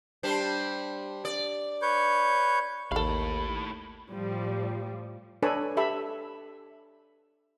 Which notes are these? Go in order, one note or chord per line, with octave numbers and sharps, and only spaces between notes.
G3 D4 C5
D5
B4 C#5 G6
A1 D#2 A2 A4 F5 B5
A2 F3 G3
D4 A4 B4 C#5 G#5 B5
G4 A4 E5 B5